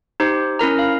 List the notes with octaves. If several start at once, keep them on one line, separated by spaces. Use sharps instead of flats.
D#4 G4 C5
C#4 E4 A#4 A#5
F5